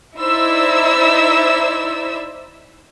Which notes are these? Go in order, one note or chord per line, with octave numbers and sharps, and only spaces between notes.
D#4 E4 C5 D5 E5 E6